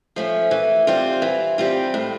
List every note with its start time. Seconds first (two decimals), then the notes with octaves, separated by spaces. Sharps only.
0.16 F3 A3 C#4
0.51 E3
0.87 G3 C4 F4
1.22 E3
1.58 G3 C4 F4
1.94 A2